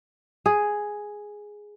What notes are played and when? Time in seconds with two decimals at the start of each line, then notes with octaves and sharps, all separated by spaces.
0.46 G#4